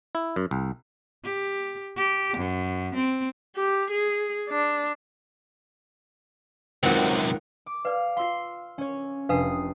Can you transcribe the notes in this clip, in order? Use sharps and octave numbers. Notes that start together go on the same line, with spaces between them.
E4
F#2
C2
G4
G4
F#2
C4
G4
G#4
D4
C#2 F#2 C3 D#3 C4 F#4 F#5
D6
B4 D5 F5
F4 F5 C6 E6 C7
C#4 C#5
F1 D4 B4 F5 D#6 C7